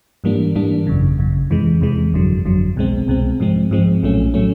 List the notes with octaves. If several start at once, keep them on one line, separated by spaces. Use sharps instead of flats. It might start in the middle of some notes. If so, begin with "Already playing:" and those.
G#2 E3 G3 A#3 D4
G#2 E3 G3 A#3 D4
G#1 F#2 C#3
G#1 F#2 C#3
E2 C3 E3 G#3
E2 C3 E3 G#3
G1 F2 D3 F#3
G1 F2 D3 F#3
C2 B2 G#3 C4
C2 B2 G#3 C4
G#2 F3 G#3 C4
G#2 F3 G#3 C4
A#1 A2 F#3 A3 C#4
A2 F#3 A3 C#4